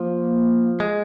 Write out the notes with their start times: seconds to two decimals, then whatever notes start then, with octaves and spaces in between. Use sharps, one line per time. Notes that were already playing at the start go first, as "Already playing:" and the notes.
Already playing: F3 A#3
0.80 G#3